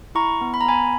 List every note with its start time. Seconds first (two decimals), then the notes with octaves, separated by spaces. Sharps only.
0.15 E4 A#5 C#6
0.41 B3
0.54 B5
0.61 A#5
0.65 B3 G#5 B5